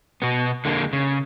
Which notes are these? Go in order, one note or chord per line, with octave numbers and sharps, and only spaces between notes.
B2 B3
D3 G#3 A#3
C#3